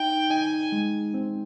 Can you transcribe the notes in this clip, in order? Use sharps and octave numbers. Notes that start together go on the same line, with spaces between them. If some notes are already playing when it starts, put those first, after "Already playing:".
Already playing: D#4 G5
D#4 G#5
G#3
C4